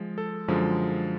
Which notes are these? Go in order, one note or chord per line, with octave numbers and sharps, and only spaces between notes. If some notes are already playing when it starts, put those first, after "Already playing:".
Already playing: F3 G#3
A4
F#2 D3 F3 G#3